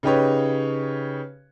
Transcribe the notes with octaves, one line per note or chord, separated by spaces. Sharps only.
C#3 D#4 G4 B4 C#5